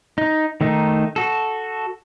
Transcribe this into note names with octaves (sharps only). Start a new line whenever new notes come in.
D#4
D#3 A3 D#4
F#4 A4